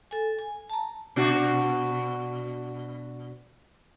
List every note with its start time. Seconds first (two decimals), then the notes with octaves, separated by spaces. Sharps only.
0.11 A4 G#5
0.39 G#5
0.70 A5 A#5
1.16 B2 D4 F#4